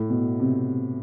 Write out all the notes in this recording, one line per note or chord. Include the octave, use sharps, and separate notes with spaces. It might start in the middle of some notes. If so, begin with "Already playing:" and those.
Already playing: A2
B2
C3